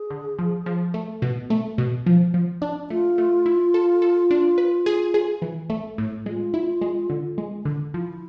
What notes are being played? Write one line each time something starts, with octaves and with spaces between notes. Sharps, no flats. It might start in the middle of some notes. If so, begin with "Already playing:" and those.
Already playing: G#4
D3
F3
F3
A3
B2
A3
B2
F3
F3
D4
A3 F4
A3
E4
A4
A4
D4
B4
G#4
G#4
E3
A3
A2
G#3 F4
E4
G#3
D3
G#3
D3
F3 E4